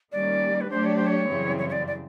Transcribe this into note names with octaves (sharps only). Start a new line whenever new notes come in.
D#3 G3 A#3 C#4 D5
B4
F#3 A3 D4 G4 C5
C#5
C5
C#5
F#2 C#3 E3 G3 C4
C#5
C#5
D5
D5